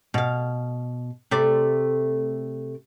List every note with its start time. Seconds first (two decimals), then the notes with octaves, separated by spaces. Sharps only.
0.14 B2 F5
1.31 C3 A3 D5